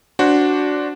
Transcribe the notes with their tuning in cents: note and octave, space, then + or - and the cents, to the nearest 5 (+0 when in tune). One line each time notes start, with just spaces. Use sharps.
D4 -10 F#4 +0 C5 +0